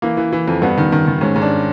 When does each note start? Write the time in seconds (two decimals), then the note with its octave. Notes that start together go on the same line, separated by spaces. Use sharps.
0.02 E3 A#3
0.17 E3
0.33 E3
0.48 F2
0.62 G2 B3
0.78 D#3
0.92 D#3
1.07 D#3
1.21 G#2 C#4
1.36 G#2
1.42 D4